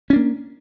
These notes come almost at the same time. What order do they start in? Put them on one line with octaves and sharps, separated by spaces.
C#4 D4 A#3